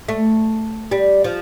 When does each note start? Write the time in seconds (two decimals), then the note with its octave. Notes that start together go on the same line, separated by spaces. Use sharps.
0.08 A3
0.91 G3
1.24 F3